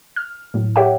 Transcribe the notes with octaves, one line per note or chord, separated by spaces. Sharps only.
F6
A2 F#3
G4 C#5 E5 F#5 G5